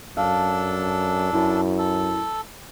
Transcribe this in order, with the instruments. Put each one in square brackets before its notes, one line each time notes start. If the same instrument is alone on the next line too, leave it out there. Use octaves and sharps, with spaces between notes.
[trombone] F#2 [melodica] D4 A4 [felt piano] F5
[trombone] F#2 [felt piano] E4
[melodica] A4